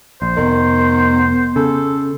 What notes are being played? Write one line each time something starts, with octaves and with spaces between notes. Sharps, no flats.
A#1 C5
F1 D#3 B3
C#3 A4